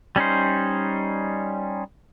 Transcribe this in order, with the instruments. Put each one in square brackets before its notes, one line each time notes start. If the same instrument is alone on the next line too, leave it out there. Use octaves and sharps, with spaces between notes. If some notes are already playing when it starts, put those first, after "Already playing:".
[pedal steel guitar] G3 C#4 D#4 C5